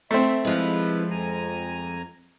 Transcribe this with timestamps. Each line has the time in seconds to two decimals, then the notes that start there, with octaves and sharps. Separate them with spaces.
0.11 A3 C4 E5
0.45 C3 F3 G#3 E4 B4
1.11 F2 G#5 A#5